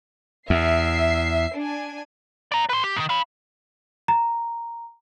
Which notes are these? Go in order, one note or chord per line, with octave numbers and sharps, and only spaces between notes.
E2 E5 C7
D4 G#5
D5 A#5
B4 C6
G4
G#2 D#3
F5 B5
A#5